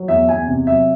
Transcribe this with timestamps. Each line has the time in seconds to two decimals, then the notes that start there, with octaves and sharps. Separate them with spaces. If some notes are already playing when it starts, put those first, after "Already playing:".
Already playing: F#3
0.08 E2 E5
0.29 E2 G#5
0.47 C3
0.67 F#3 E5